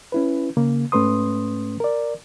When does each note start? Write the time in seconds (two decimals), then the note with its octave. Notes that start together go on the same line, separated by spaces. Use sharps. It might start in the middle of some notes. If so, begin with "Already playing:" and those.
0.12 C#4 E4 B4
0.57 C#3 A#3
0.92 G#2 A3 C#4 B4 C6 D#6
1.80 A#4 D5